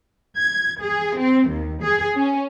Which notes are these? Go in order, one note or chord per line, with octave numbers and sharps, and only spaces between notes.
G#6
G#4
C4
D#2
G#4
C#4